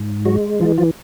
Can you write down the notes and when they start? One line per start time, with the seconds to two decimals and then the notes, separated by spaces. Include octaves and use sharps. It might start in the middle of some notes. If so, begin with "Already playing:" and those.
Already playing: G#2
0.25 F#3 G#3 F#4
0.60 E3 F3 F4
0.78 F3 F4